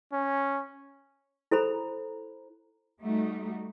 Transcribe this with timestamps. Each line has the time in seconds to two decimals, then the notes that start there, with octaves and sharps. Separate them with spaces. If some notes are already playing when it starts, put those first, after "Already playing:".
0.12 C#4
1.51 E4 A4 C5 A#5 B5
3.02 G3 A3 D#4 F#4